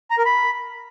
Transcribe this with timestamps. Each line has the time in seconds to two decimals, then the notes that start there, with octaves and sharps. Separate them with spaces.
0.11 A#5
0.18 A#4
0.25 B5